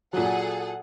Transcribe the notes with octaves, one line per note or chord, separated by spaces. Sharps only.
A#2 F#3 G#4 A4 F#5